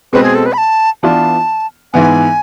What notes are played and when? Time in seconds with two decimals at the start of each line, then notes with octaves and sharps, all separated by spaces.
0.13 B2 G#3 C4 B4
0.23 G#4
0.35 A4
0.46 B4
0.53 B5
0.58 A5
1.03 E3 B3 D4 F4 A5
1.93 G#2 E3 B3 G#5